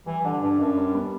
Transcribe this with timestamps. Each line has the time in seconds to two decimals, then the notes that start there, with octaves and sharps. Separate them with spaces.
0.06 E3 G3
0.24 D3 D4
0.42 G2 D4
0.59 F#2 D4
0.77 G3
0.94 B3